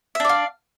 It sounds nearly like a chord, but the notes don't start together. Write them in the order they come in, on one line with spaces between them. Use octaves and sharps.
E5 D4 D5 F5